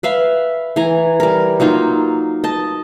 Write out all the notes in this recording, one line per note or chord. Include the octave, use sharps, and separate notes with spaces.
B4 E5 F5 B5
E3 G#5 A#5
G3 A#4
F#3 A#3 D#4 F4
D#5 A5